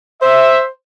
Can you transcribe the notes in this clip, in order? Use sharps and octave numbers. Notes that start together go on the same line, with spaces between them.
C5 E5